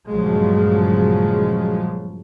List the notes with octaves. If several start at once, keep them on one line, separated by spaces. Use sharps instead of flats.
A#1 G2 C#3 F3 F#3 G#3